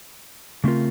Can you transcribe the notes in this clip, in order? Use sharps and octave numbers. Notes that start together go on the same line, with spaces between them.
C#3 A3 C4 F4 A#4